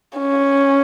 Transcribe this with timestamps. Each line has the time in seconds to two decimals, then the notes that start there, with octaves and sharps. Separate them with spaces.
0.18 C#4